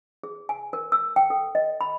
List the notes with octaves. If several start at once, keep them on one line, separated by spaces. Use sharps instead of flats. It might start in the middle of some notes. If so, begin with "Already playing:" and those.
G#4
G#5
A#4
E6
G5
A4
D#5
B5